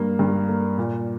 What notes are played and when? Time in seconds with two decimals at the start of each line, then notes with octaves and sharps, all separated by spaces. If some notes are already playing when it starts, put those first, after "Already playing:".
Already playing: G2 A#3
0.19 G2
0.49 A#3
0.78 A#2